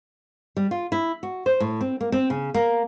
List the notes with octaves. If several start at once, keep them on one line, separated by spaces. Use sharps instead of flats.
G3
F4
E4
F#4
C5
A2
C4
A#3
C4
C#3
A#3